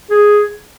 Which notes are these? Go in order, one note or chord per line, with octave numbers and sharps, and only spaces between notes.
G#4